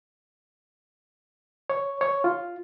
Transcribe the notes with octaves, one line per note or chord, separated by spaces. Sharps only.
C#5
C#5
F4